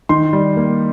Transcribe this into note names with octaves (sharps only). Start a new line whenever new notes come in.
D#3 C6
G3
A#3